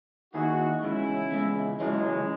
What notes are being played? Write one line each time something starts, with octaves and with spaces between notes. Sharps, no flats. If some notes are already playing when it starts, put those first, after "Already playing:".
D#2 D#3 A#3 D#4 E4 F#4 G#4
E2 C#3 G#3 C#4 E4
E2 C#3 G#3
C#2 C#3 E3 F#3 G#3 C#4 E4